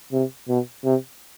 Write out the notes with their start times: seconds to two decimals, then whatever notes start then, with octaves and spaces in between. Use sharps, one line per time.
0.12 C3
0.48 B2
0.85 C3